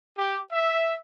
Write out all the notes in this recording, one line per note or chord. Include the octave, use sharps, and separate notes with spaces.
G4
E5